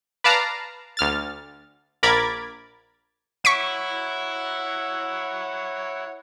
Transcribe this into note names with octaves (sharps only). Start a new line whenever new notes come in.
B4 D5 F5 A5 A#5
D2 F6 A6
A#1 A#4 B5 D6 G#6 A6
E4 C#5 F#5 C#6 B6 D7